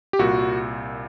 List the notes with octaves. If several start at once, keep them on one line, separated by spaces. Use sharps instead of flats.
G4
C2 A#2 F#4